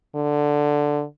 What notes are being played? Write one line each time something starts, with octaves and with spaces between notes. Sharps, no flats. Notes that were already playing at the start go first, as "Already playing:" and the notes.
D3